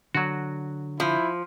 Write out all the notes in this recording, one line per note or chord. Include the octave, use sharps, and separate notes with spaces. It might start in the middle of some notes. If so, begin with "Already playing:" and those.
D3 F#3 F#4
F3 E4